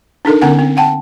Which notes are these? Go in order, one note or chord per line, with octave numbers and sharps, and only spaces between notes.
D4 D#4 A4 A#4
D3 B3 C#4 A#4 F#5 G#5
C4
F#5 G5 A5